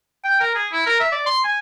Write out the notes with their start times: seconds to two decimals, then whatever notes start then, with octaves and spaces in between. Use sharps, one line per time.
0.24 G5
0.40 A#4
0.55 G#4
0.73 E4
0.87 A#4
1.00 E5
1.12 D5
1.26 C6
1.44 G#5